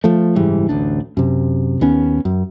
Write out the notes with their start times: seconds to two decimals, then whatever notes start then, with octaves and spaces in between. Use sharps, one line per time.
0.04 F3 A3
0.36 F#1 G#2 E3 G3
0.69 A1 D2 D4
1.17 F#2 C3
1.81 D#2 B3 C#4
2.25 F#2